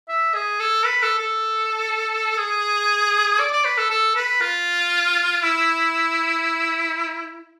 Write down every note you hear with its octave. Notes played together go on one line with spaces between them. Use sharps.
E5
G#4
A4
B4
A4
A4
G#4
D5
D5
B4
A4
A4
B4
F4
E4